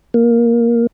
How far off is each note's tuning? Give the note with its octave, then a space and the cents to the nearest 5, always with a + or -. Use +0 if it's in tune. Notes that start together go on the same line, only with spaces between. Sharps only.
A#3 +10